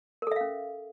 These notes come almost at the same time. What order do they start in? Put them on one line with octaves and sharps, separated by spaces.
A#4 A4 E5 F5 C#4